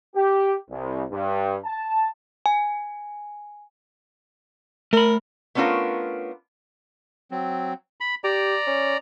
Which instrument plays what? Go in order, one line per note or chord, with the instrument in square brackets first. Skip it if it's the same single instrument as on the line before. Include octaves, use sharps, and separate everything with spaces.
[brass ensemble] G4
C2
G2
A5
[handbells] G#5
[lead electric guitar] A3 B5 [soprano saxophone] A#4
[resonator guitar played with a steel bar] A3 B3 C#4 D4 F4 A#4
[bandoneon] F#3 C4
B5
[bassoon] G4 [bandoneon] D5 A#5
[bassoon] C#4